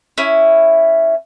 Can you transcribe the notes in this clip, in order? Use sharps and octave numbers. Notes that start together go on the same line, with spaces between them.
C#4 E4